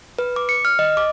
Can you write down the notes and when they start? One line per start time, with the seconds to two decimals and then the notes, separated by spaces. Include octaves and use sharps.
0.19 B4
0.36 D6
0.49 C#7
0.65 F6
0.79 D#5
0.97 D6